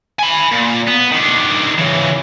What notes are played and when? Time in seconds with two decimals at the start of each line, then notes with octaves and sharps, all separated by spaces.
0.19 G#5 B5
0.52 A#2
0.88 B3
1.12 D#3 D4
1.78 C#3 E3